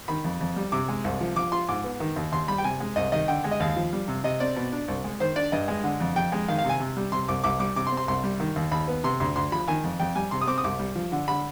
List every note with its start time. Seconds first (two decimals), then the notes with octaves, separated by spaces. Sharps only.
0.08 D#3 B5
0.24 F2
0.41 F2
0.56 G3
0.72 C3 D6
0.88 G#3
1.04 C2
1.21 F3
1.36 F3 D6
1.52 F4 C6
1.68 G#2 D6
1.84 B3
2.00 D#3
2.16 D#2
2.32 D#2 C6
2.48 G3 B5
2.58 G5
2.64 C3 G#5
2.80 G#3
2.96 C2 D#5
3.12 D#3 D#5
3.28 D3 G5
3.44 G#3
3.51 D#5
3.60 D#2 F5
3.76 F3
3.93 G3
4.08 C3
4.24 C3 D#5
4.40 C4 D5
4.56 B2
4.72 D4
4.88 C2
5.04 G#3
5.20 D#3 C5
5.36 D4 D5
5.52 G2 D#5
5.68 G#3
5.84 D3
6.00 F2
6.16 F2 G5
6.32 G#3
6.48 D#3 F5
6.58 F5
6.64 C3
6.70 G#5
6.80 C3
6.97 G3
7.12 C3 C6
7.28 C2 D6
7.44 C2 D6
7.59 G3 D6
7.76 C3 D6
7.87 C6
7.92 C4
7.97 C6
8.08 C2 C6
8.24 G3
8.40 D#3
8.56 D#2
8.72 D#2 B5
8.88 B3
9.04 C3 C6
9.20 D2 C6
9.36 D2 C6
9.52 F3 B5
9.68 D#3 G#5
9.84 F2
10.00 F2 G5
10.16 G3 G#5
10.31 C3 C6
10.41 D#6
10.47 C4 D6
10.58 D#6
10.64 C2 D6
10.80 G3
10.95 F3
11.12 D3
11.28 D3 B5